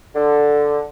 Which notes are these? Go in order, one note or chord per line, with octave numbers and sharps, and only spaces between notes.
D3